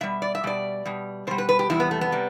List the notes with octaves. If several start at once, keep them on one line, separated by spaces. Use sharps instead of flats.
B2 G3 E5
D5
E5
B2 G3 D5
B2 G3
B2 G3 C5
B4
B4
G4
E2 C3 G3 E4
B3
A3
B3
C3 G3